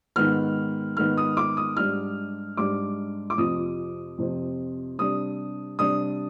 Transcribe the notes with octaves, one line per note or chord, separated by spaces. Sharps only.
G#2 D#3 B3 F6
G#2 D#3 B3 F6
D#6
D6
D#6
G#2 G3 D4 F6
G#2 G3 D4 D6
D6
F2 C3 F3 C4 D#6
F2 C3 F3 C4
C3 G3 D4 D#6
C3 G3 D4 D#6